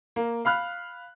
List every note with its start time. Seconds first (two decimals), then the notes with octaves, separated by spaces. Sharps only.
0.16 A#3
0.45 F5 B5 F6 F#6